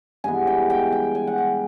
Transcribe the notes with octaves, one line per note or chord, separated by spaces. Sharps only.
G2 E3 G#3 B3 G#5
G5
G5
G5
G#5
F#5
G5